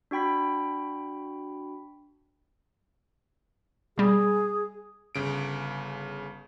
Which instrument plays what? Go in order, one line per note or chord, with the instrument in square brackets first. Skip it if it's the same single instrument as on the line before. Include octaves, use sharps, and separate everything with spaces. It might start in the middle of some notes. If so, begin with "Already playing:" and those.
[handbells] D4 F#4 G5 B5 B6
[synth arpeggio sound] B2 G3 [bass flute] G#4
[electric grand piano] G1 C#3 D7